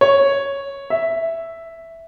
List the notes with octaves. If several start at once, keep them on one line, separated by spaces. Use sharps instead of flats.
C#5
E5